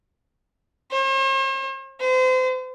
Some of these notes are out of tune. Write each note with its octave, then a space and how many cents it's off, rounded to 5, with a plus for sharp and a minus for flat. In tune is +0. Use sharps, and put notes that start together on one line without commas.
C5 +45
C5 -35